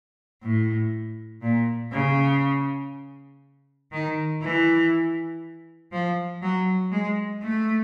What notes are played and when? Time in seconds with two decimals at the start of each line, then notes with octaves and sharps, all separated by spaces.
0.43 A2
1.42 A#2
1.92 C#3
3.92 D#3
4.41 E3
5.92 F3
6.42 F#3
6.91 G#3
7.42 A3